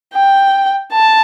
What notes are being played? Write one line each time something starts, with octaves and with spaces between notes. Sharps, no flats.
G5
A5